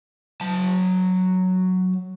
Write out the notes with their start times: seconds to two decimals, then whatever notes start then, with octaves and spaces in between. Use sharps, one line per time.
0.41 F#3 A5